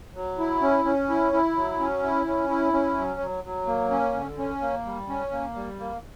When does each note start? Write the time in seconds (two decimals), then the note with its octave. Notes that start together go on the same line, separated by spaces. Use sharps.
0.15 F#3
0.38 E4
0.62 C#4
0.85 C#4
1.09 E4
1.32 E4
1.56 F#3
1.80 C#4
2.02 E4
2.26 C#4
2.49 E4
2.73 C#4
2.97 F#3
3.20 F#3
3.44 F#3
3.67 A#3
3.91 C#4
4.14 D3
4.38 C#4
4.61 A#3
4.85 G3
5.09 C#4
5.32 A#3
5.55 G3
5.79 A#3